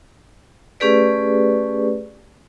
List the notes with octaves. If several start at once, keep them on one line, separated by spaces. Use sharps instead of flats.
A3 C#4 G4 G#4 B4 D5